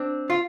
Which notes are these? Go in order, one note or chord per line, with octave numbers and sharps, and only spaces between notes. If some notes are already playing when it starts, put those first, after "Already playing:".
Already playing: C4 D4
F4